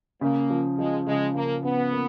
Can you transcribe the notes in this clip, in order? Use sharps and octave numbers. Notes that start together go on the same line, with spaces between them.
C#3 A#3
F3
F3 G#3
C#3 G#3
C#3 A#3
C#3 B3
A#3